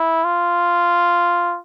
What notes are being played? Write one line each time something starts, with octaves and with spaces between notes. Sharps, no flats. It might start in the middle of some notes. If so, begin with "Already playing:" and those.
Already playing: E4
F4